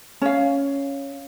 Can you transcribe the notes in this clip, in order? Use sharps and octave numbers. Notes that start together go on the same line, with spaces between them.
C#4 F5